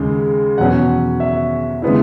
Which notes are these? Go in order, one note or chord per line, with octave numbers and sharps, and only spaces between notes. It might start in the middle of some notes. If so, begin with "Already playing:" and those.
Already playing: D#2 C#3 G#3
E2 B2 F#3 C#4 F#5
E5
C#3 G#3 B3 E4